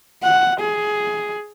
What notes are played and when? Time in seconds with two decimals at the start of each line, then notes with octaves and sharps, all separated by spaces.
0.24 F#5
0.60 G#4